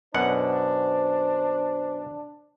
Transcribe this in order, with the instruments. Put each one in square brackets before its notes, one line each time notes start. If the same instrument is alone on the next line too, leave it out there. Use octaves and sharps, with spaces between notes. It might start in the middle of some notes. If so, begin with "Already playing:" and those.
[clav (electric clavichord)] F#2 B2 F#5 [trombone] D4 [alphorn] C5